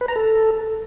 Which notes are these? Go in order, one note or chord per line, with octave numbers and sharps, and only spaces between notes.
B4
A#5
A4